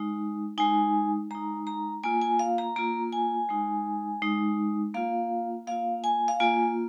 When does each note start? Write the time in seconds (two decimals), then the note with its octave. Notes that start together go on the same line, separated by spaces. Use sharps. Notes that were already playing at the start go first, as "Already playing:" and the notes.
Already playing: G#3 D#4
0.58 G#3 D#4 G#5
1.31 G#3 D#4 A#5
1.67 A#5
2.03 A#3 F4 G#5
2.22 G#5
2.39 F5
2.58 A#5
2.76 A#3 F4 A#5
3.13 G#5
3.49 G#3 D#4
4.22 G#3 D#4
4.94 A#3 F4 F5
5.67 A#3 F4 F5
6.04 G#5
6.28 F5
6.40 A#3 F4 G#5